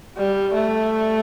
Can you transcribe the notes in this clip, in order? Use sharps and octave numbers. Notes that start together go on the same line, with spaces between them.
G3
A3